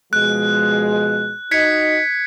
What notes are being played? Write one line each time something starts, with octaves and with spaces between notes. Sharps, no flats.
B2 F3 G#3 F#6
D#4 F#4 D#5 G#6 B6 C#7